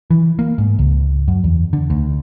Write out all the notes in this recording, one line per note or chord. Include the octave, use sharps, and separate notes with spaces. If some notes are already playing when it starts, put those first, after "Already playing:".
E3
A#3
G#2
C#2
F#2
E2
D3
D2